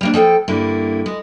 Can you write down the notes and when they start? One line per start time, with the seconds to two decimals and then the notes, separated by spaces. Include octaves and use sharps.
0.01 G3 A#3 D4
0.14 F3 A4 F#5 G5
0.48 G2 D3 A#3 E4
1.06 G#3